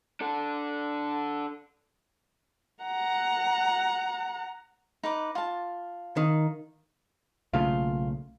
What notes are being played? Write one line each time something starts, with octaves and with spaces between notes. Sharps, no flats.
D4 A4
F#5 A#5
D#4 B4 D6
F4 A5
D#3
B1 C#3 A3 A#3 F4